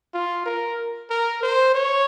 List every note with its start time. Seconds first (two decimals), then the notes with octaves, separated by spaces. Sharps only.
0.14 F4
0.46 A#4
1.10 A#4
1.43 C5
1.75 C#5